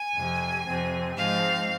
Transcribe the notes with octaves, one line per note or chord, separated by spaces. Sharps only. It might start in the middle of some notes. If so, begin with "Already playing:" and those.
Already playing: G#5
F2 C3 F3
F2 C3 F3 C4
G#2 F3 G#3 C4 F5